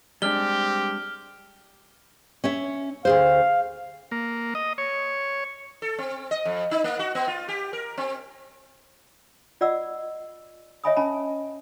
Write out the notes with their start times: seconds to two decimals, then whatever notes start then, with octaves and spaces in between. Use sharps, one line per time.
0.22 G3 G#3 C4 D4 G4 F6 G7
2.44 C#4 C#5 E5
3.05 D2 G#4 C5 F5
4.11 A#3
4.55 D#5
4.78 C#5
5.82 A4
5.98 C4
6.31 D#5
6.45 F2
6.71 D#4
6.84 A#3
6.99 F#4
7.15 B3
7.27 F4
7.49 G4
7.73 A#4
7.98 C4
9.61 F4 D5 D#5 F#5 E6
10.84 C#5 D#5 E5 G#5 B5 D#6
10.96 C#4 G#5 A5 B5